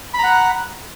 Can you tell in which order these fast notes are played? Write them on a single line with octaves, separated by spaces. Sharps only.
B5 A#5 F#5